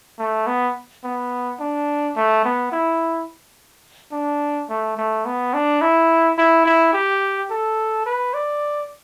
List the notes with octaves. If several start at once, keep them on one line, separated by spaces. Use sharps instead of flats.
A3
B3
B3
D4
A3
B3
E4
D4
A3
A3
B3
D4
E4
E4
E4
G4
A4
B4
D5